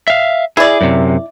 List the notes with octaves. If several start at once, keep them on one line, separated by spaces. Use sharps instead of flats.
E5 F5
E4 G#4 D5
F#2 C3